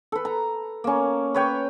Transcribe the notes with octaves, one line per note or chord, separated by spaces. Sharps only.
A4 B4
A#5
A#3 C#4
B4 C#5 G5